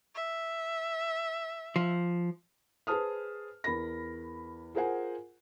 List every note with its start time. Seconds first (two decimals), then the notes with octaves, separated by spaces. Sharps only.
0.15 E5
1.76 F3
2.87 G#4 B4 C5 A5 D#6 F6
3.64 E2 A#4 B5 A#6
4.75 F4 G#4 A#4 C5 F#5 G#5